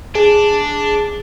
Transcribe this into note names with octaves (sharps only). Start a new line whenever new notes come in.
D4 G#4